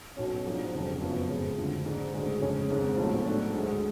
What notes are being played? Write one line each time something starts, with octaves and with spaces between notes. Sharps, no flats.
B1 B2 F#3 C#4
G#2 F3 G#3 D4
F1 F2 C#3 F#3
F#2 F3 B3
F2 C#3 G#3
D2 D3 F3
G#2 G#3 D4
D2 C#3 G#3 D4
F2 C#3 G#3 C#4
G#1 G#2 G#3
B1 A2 F3
G#2 F#3 A3 D4
D2 D3 G#3